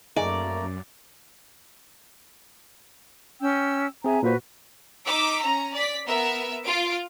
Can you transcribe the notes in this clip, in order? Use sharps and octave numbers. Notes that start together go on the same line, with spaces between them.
F#2 A3 A#3 D#4 G#4 D5 A#5
C#4 G5 E6
C4 G#4 E5 G#5 A#5
A#2 A#3 F#4 B4 C5
D#4 D6 E6 B6
C#4 A#5
D5 B6
B3 A#4 E5
F4 D7